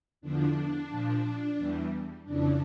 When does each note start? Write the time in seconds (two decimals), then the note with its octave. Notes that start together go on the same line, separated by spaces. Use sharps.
0.21 E2 D3 F3 D4
0.90 A#2 F3
1.57 E2 E3 G3
2.24 F2 C#3 E3 D4